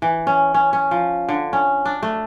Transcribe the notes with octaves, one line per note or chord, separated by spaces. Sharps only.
E3
C#4
C#4
C#4
F3
D3
C#4
D4
A3